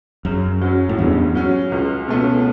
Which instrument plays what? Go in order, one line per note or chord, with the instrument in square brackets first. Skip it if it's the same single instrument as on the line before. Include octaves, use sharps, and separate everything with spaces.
[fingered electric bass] F#2 [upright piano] C#3
[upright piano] F#3 C#4
[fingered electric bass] A2
[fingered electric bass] E2 G2 [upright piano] C#3
[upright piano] F#3 C#4
C#2
B2 A3 C#4